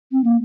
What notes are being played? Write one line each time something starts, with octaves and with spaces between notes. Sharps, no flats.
C4
A#3